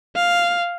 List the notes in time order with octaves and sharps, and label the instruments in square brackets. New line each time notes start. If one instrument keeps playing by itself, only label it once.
[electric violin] F5